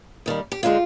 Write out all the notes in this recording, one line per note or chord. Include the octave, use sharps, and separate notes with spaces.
D#2 D#3 G3
G4
D3 G#3 D#4 F4